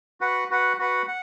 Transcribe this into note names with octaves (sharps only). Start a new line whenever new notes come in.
F#4 B4 F#5
F#4 B4 F#5
F#4 B4 F#5
F#5